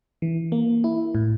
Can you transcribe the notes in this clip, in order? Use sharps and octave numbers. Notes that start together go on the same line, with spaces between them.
E3
A#3
E4
A2